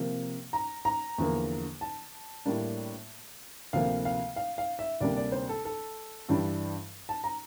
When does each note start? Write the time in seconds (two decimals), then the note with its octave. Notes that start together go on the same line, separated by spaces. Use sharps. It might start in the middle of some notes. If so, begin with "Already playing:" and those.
Already playing: C3 F3 A#3
0.53 A#5
0.85 A#5
1.18 E2 D3 F3 A#3
1.81 A5
2.46 A2 G3 A#3 D4
3.73 D2 C3 F3 A#3 F5
4.05 F5
4.36 F5
4.58 F5
4.79 E5
5.01 D2 C3 G3 A#3 D4 D5
5.16 D5
5.32 C5
5.49 A4
5.65 A4
6.29 G2 E3 G3 D4
7.09 A5
7.24 A#5